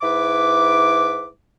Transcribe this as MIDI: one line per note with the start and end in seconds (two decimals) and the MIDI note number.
0.02 1.29 44
0.02 1.29 64
0.02 1.29 71
0.02 1.29 86